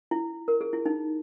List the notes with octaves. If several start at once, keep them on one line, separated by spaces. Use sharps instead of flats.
E4
A#4
G#4
E4
D#4